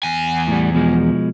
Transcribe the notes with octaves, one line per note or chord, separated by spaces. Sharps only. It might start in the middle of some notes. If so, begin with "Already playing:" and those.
E2 G#5
A2 G3
B2 F3 G#3